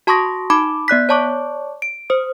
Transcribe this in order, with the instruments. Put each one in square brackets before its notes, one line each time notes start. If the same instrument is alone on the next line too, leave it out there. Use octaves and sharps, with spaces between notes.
[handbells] F#4 A5 C6 C#6 D#6 A#6
D#4 A5 B5 D6
B3 D5 F#6 B6
C#5 D5 A5 C#6 D6
D7
C5 D#6